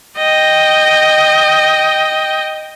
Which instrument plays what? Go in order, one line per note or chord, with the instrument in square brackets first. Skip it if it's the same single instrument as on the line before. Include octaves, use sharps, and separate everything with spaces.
[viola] D#5 G5